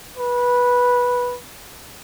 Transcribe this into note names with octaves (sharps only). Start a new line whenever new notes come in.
B4